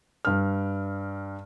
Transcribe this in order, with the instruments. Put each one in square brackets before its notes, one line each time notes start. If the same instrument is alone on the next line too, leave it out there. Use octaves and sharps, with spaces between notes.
[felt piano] G2 F6